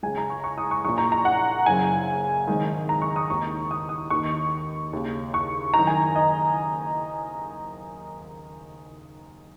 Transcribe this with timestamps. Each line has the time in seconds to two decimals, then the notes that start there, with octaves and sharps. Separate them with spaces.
0.03 C#2 C#3 G#5
0.17 A#5
0.30 C#6
0.44 C#6
0.58 D#6
0.71 C#6
0.85 A#1 A#2 C#6
0.98 A#5
1.12 A#5
1.25 F#5
1.66 F#1 F#2 C#3 G#5
2.47 G#1 G#2 D#3
2.89 A#5
3.02 C#6
3.16 D#6
3.30 D#2 D#3 C#6
3.71 D#6
3.89 D#6
4.10 D#2 D#3 C#6
4.93 D#2 C#3
5.34 C#6
5.74 F#1 F#2 D#3 A#5
5.87 G#5
6.16 D#5